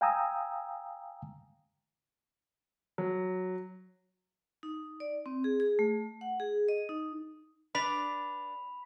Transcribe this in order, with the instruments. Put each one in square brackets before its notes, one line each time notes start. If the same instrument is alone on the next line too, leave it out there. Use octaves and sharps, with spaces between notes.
[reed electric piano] F5 G5 G#5 A#5 D#6 E6
[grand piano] F#3
[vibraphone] D#4
D5
C4
G#4
G#4
A3
F#5
G#4
D#5
D#4
[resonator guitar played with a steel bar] D4 B4 D5 [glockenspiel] B5 B6 F7